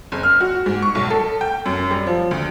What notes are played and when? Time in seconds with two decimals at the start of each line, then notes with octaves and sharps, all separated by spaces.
0.12 F#1
0.23 F6
0.40 F#4
0.66 G#2
0.82 C#6
0.95 B1
1.10 A4
1.41 G5
1.66 F#2
1.91 G3
2.07 F3
2.31 D2